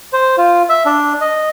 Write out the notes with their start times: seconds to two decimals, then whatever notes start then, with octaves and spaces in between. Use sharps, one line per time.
0.13 C5
0.38 F4
0.69 E5
0.86 D4
1.21 D#5